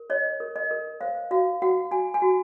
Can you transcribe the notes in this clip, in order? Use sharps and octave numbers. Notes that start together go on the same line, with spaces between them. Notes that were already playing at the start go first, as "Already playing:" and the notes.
Already playing: A#4
C#5 D#5
A#4
D#5
A#4
C5 F5
F#4 F5
F#4 F#5
F#4 G#5
G#5
F#4